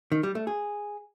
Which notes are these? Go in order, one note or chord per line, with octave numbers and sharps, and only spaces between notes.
D#3
G3
A3
G#4